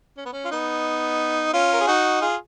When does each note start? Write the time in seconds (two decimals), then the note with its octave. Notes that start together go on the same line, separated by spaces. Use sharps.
0.17 C#4
0.25 B3
0.33 C#4
0.45 F4
0.51 B3 D#4
1.54 C#4 F4
1.73 A#4
1.81 G#4
1.87 D#4 F#4
2.22 F4 G#4